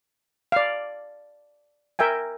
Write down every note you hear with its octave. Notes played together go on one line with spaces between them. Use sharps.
D5 F5
A#4 E5 G5 G#5